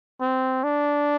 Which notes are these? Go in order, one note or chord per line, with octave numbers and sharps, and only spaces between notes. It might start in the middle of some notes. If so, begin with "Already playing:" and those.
C4
D4